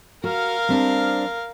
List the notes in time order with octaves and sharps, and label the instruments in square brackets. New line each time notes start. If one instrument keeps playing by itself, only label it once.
[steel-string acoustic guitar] F#4 [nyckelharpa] A#4 F5
[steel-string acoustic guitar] G3 C4 D4